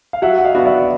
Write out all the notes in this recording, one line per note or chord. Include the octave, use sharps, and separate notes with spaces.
F5
F#3 E5 F#5
F#5
D#5 F5
B3 D4 F#4
D5 E5